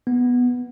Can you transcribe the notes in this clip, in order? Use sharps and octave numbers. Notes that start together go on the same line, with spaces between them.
B3